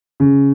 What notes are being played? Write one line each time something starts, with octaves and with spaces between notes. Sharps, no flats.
C#3